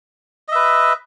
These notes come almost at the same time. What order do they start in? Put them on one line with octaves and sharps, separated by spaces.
D#5 E5 B4